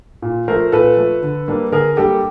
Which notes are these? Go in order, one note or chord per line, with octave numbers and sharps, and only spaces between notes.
A#2
F3 A3 A#4 C5
A#2 A4 B4
F3 A3
D3
G3 A#3 D4
D3 G#4 A#4
G3 A#3 D4 G4 A4